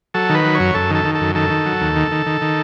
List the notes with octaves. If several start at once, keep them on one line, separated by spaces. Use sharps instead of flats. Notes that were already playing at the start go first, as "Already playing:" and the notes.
F#3 A4
D#3
B4
F#3
C#5
F#2
F#2 A4
D#3
A4
D#3
A4
F#2
D#3 A4
D#3
F#3
D#2
D#3
D#3
D#3
D#3